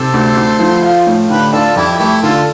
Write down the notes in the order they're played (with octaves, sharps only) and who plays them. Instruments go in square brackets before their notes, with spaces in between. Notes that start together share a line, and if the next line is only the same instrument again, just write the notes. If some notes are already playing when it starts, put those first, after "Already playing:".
Already playing: [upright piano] C3 [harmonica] A4 C5
[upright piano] D2
D2
F3
F4
A2
[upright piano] D3 [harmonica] G4 B4
[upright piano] D4 [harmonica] F4 A4
[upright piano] F2 [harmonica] E4 G4
[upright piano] A3 [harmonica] E4 G4
[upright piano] D3 [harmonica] F4 A4